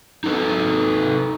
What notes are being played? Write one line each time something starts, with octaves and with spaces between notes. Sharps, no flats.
D#4 A4 B4